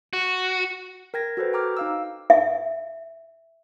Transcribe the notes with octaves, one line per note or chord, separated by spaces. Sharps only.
F#4
A#4 G5 G#6 A#6
F#4 A4 B4 C5
G5 A#5 D6 F6
D#4 F5 E6
E5